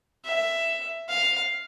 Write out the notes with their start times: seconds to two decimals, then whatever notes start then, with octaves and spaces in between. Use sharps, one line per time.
0.25 E5
1.09 F5